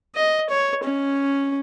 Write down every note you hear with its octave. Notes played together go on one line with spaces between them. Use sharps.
D#5
C#5
C#4